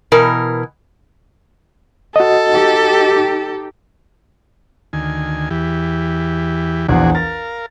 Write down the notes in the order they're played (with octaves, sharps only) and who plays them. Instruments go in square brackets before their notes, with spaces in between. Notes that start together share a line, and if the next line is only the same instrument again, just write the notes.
[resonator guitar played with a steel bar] B2 E3 A#4
[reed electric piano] F#4 D#5 [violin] A4
[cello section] D#4 G4
[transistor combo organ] D2 D#3 G#5
E2 E3 G4
[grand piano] A#1 E2 [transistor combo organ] F#4 G#4 D5
[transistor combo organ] A#4 F5 [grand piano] A6